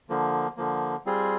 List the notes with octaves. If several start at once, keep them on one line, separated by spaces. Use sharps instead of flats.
D3 F3 A#3
D3 F3 A#3
G3 C4 F4 G#4